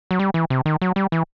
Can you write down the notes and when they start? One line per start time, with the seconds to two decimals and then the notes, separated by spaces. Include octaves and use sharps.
0.11 F#3
0.19 G3
0.34 E3
0.50 C3
0.66 D#3
0.82 F#3
0.96 G3
1.12 E3